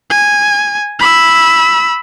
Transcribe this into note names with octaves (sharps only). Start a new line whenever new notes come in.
G#5
B5 E6